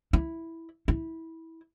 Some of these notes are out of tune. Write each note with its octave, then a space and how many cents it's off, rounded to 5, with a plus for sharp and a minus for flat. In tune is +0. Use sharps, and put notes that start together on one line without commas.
E4 -5
E4 -20